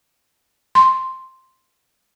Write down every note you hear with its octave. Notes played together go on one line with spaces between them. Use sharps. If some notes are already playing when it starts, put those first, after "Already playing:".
C6